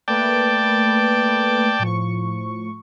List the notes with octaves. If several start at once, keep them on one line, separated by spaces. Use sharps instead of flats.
A3 A#3 B4 D5 G5 A5
A2 F3 C#6